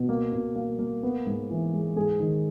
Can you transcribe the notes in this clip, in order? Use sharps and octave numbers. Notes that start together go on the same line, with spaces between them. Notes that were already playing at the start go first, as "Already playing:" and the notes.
Already playing: B2
A#3
B2
A#3
A#3
B3
G#2
E3
G#3
G#2 G#4
D#3